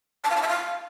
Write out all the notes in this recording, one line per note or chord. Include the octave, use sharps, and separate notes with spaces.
A5
F5
A5
E5
F5